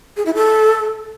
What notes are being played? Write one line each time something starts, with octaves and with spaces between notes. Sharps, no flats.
G#4
E4
A4